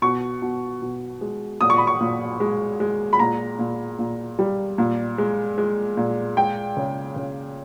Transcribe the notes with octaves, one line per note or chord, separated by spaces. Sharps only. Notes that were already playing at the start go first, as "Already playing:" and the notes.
B2 C#6
B2
B2
G#3
A#2 D#6
C#6
B5
C#6
A#2
G#3
G#3
B5
A#2 A#5
A#2
A#2
G3
A#2
G#3
G#3
A#2
G#3 G5
C#3
C#3